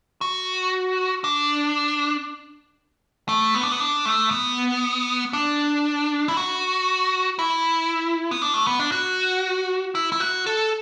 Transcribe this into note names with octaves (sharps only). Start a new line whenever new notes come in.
F#4
D4
A3
B3
D4
B3
D4
A3
B3
D4
E4
F#4
E4
B3
D4
A3
B3
D4
F#4
E4
E4
F#4
A4